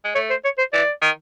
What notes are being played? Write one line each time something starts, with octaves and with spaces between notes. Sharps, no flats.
G#3
A3 C#5
C5
C#5
C5
E3 D5
D#3